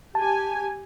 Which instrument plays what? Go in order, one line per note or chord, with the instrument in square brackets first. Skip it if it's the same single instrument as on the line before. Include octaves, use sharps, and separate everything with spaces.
[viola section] G4 G#5 [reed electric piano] A5